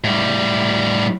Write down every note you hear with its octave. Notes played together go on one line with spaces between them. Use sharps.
A2 G3